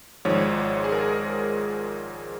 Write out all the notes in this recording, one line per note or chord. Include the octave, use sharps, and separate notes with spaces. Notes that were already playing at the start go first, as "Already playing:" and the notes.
G#1 G#2 F3 C#5
G#4
A#4